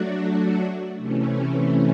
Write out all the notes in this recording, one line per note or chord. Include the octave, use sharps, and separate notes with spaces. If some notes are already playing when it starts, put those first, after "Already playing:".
Already playing: F#3 A3 D4 F#4
C3 E3 A3 C#4